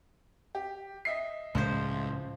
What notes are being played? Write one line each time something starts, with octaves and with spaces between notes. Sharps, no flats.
G4
D#5 E5 C7
C#2 A2 F3 G#3 C#4 C5